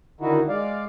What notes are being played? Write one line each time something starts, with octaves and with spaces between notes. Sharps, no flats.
D3 D#3 D#4 E4 F#4
G#3 D5 F5